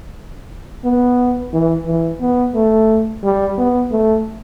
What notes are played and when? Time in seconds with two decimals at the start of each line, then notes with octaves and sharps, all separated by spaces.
0.84 B3
1.53 E3
1.86 E3
2.20 B3
2.55 A3
3.23 G3
3.58 B3
3.91 A3